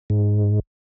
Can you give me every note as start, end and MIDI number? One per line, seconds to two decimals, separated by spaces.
0.10 0.60 44